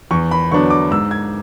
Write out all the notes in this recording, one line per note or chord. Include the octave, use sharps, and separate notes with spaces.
E2 C#6
B5
D3 F#3 B3 D4 C#6
D6
G#2 E6
G#6